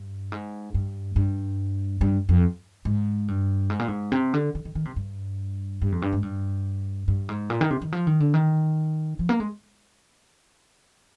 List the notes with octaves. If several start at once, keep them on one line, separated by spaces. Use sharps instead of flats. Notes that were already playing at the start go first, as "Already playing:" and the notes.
Already playing: G2
G#2
G2
G2
G2
F2
G#2
G2
G#2
A#2
G#2
C3
D3
D3
D#3
D#3
C3
G2
G2
F2
G2
G#2
G2
G2
G#2
A#2
D#3
C3
D#3
F3
D#3
D3
D#3
F3
A#3
G#3